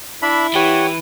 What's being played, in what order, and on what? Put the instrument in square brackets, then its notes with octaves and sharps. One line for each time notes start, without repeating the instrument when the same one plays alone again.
[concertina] D4 E5 B5 [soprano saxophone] E4
[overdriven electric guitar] E3 [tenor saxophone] G4 [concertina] C#5 F#5